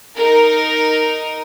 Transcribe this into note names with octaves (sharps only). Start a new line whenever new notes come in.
D#4 A#4